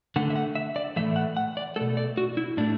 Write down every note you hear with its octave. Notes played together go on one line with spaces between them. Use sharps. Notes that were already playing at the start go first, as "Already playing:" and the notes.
D3 A3 F#5
E5
F#5
E5
D5
A2 E3 A3 E5
F#5
F#5
D5
B2 A3 A4
D5
F#4
E4
A2 A3 D4